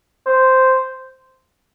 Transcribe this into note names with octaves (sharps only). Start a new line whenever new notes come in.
C5